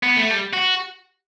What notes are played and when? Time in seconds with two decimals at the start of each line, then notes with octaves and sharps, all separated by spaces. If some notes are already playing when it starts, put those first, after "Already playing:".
0.03 B3
0.16 A3
0.31 G3
0.53 F#4